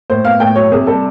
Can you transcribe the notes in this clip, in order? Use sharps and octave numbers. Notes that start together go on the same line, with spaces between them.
A2 C5
B3 F5
A2 G5
F#3 C#5
C3 G#4
G3 A4